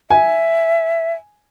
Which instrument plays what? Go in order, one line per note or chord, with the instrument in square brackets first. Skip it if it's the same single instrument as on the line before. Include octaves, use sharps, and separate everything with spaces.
[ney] E5 [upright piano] G#5